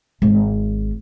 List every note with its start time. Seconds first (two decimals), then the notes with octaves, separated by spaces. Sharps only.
0.22 G#1